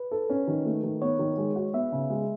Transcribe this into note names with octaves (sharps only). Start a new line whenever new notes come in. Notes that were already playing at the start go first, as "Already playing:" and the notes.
Already playing: B4
A4
C#4
D#3
A3
D#3
B3 C#5
D#3
G#3
F#4
B3 E5
C#3
G#3